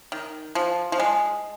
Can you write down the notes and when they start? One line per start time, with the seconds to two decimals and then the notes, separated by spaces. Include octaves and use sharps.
0.12 D#3
0.55 F3
0.92 F3
1.00 G#3